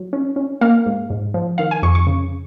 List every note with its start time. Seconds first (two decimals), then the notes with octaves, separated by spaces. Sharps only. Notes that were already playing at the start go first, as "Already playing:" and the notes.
Already playing: F#3
0.13 C#4
0.36 C#4
0.61 A#3 F5
0.86 G#2
1.10 G#2
1.34 F3
1.58 D#3 F5
1.71 G#5
1.82 F2 C#6
1.95 C#6
2.07 C#3